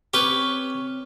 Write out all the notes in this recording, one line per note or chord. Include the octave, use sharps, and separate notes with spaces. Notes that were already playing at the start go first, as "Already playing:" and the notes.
C4 C#4 G4 B4 C#5